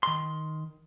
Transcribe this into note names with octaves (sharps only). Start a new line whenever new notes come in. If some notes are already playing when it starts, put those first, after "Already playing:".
D#3 C6